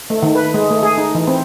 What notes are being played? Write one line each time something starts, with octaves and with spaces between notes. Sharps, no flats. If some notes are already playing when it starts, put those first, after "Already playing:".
A3
D#3
B4
G#3
A3
G#4
D#4
E3
C4